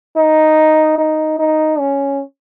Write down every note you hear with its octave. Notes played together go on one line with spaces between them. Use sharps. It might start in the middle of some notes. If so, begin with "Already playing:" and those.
D#4
D#4
D#4
C#4